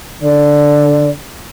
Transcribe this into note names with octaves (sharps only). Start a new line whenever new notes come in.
D3 D5